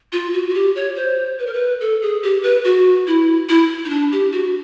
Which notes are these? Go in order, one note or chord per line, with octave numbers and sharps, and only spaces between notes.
F4
F#4
F#4
G4
C#5
C5
B4
A#4
B4
A4
G#4
G4
B4
F#4
E4
E4
D#4
D4
G4
F#4